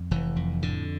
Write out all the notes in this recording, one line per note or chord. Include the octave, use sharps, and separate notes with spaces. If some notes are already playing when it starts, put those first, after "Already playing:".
Already playing: F2
F1 E3
F2
A2 D3